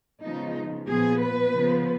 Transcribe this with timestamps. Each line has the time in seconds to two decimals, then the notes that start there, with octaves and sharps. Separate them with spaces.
0.22 C#3 F3 G#3 B3 D#4
0.87 A#2 F3 B3 G#4
1.19 B4
1.52 C#3 F3 B3